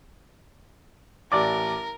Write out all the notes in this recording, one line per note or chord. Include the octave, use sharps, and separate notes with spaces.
A1 A#4 D5 D6